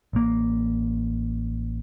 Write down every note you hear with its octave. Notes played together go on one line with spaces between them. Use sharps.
A1 A#3